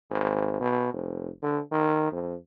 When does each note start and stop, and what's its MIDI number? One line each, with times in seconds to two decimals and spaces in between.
0.10 0.59 32
0.60 0.91 47
0.93 1.29 29
1.43 1.60 50
1.71 2.10 51
2.12 2.34 41